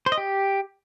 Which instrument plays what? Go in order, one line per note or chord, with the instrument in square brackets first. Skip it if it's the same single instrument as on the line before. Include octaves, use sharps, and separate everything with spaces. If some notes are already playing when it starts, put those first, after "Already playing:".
[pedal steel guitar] C5
D#5
G4